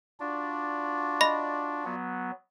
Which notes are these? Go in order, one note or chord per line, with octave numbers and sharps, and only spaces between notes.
D4 F4 F#4 D5
D#5 B5 A#6
F#3 B3